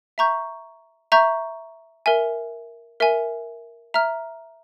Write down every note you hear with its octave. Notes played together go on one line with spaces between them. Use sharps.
E5 A#5 C#6 G6
E5 A#5 C#6 G6
A#4 E5 G#5
A#4 E5 G#5
E5 A#5 F6